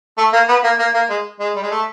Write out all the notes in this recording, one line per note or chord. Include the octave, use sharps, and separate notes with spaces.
A3
A#3
B3
A#3
A#3
A#3
G#3
G#3
G3
G#3
A3